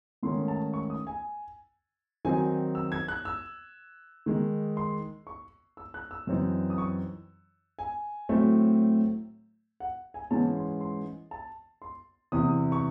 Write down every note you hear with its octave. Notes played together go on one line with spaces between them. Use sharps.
G#2 D#3 A3 C#4 C6
A5
C#6
D#6
G#5
D#3 F#3 C4 D#4 G#5
E6
G#6
F#6
E6
D#3 G#3 D#4
C6
C#6
E6
F#6
E6
F#2 E3 C4 D#4
D#6
C#6
G#5
A2 F#3 A3 C4
F#5
G#5
G#2 E3 G#3 C#4 A5
C6
C6
A5
C6
E2 C3 E3 D#6
C#6